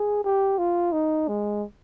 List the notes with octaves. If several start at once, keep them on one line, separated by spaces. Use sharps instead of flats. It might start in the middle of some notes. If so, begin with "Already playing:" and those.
Already playing: G#4
G4
F4
D#4
G#3